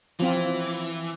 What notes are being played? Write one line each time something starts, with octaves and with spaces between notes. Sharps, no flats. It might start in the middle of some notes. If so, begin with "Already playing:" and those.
E3 F3 C4 F4